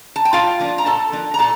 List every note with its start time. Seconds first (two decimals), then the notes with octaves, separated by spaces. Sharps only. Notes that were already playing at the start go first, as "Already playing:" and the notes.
0.16 A5
0.25 G5
0.33 A#2 F4 F5
0.60 F3 A#3 D4
0.78 A#5
0.86 A#2 A4 A5
1.12 F3 A#3 D4
1.34 A#5
1.39 A#2 A4 A5